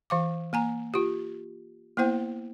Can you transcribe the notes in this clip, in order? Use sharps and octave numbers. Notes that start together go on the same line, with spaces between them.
E3 F5 D6
A#3 G#5 A#5
F4 G4
A#3 B3 E4 C5 G5